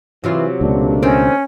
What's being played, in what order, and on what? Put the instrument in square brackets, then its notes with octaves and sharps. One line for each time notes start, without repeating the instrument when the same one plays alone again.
[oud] C3 F#3 F4 [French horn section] E3
[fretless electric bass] C#2 B2 [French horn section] A3 A#3 D4
[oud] D#3 C4 [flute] C#4